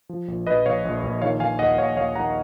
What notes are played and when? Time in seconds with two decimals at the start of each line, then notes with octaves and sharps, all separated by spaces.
0.09 F3
0.28 A#1
0.47 A#1 B4 D#5
0.66 A#1 C#5 F5
0.85 A#1
1.03 A#1
1.22 D#3 C#5 F5
1.40 D#3 F5 G#5
1.59 D#2 D#5 F#5
1.78 D#2 C#5 F5
1.97 D#2 C#5 F5
2.15 D#2 F#5 A#5